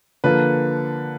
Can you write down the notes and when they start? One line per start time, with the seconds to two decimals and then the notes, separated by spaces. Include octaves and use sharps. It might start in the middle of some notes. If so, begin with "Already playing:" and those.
0.24 D3 F3 A#3 B4